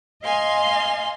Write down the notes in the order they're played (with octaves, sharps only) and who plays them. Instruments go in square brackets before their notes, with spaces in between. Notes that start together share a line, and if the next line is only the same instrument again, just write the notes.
[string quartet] D#5 F5 G#5 C6